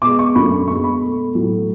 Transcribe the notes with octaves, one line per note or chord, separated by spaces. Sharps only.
B2 G#3 D6
C#6
F#2 D3 F#3 B5
C#6
B2 G#3 C#6
B5
B2 A3
A2 F#3 A3